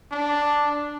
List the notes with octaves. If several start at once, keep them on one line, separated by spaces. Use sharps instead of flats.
D4